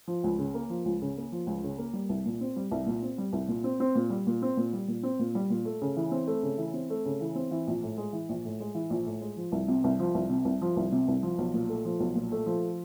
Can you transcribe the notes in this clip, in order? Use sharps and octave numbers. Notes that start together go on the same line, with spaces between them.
F3
C#2
C#3
A#3
F3
C#2
C#3
A#3
F3
C#2
C#3
A#3
G3
C2
A#2
C4
G3
C2
A#2
C4
G3
C2
A#2
C4
C4
A#2
G3
A#2
C4
A#2
G3
A#2
C4
A#2
G3
A#2
A3
C#3
E3
C4
A3
C#3
E3
C4
A3
C#3
E3
C4
E3
A#1
A2
G#3
E3
A#1
A2
G#3
E3
A#1
A2
G#3
F3
C2
C3
C2
F3
C2
C3
C2
F3
C2
C3
C2
F3
B1
A#2
A3
F3
B1
A#2
A3
F3